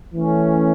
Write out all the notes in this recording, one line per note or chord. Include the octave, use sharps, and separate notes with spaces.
E3 A3 C#4